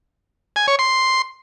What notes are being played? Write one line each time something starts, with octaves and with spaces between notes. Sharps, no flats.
G#5
C#5
C6